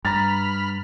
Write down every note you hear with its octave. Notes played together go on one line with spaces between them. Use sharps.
G2 A#5 B5 F6 A6